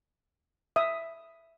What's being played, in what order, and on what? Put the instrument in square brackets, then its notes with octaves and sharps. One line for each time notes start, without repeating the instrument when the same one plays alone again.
[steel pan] E5 D#6